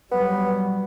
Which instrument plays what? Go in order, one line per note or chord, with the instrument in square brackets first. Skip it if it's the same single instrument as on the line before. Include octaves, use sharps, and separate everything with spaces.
[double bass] F#3 G3 [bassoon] B3 [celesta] B4